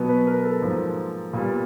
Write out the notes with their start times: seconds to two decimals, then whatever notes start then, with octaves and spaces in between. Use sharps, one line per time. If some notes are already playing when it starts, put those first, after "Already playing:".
Already playing: B2 F#3 B3
0.09 B4
0.27 A#4
0.45 A4
0.62 G#2 F3 A#3
1.33 A#2 G3 B3